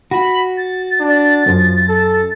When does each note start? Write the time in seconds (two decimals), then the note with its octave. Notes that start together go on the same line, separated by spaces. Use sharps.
0.11 F#4 B5
0.57 A6
1.00 D4
1.46 F#2 F3
1.89 A4